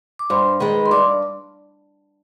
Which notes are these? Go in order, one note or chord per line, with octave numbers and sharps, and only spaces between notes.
D6
G2 C5 C6
D#3 G#3 B4 B5
C6
G2 D5 D6